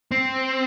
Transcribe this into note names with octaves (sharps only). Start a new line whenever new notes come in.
C4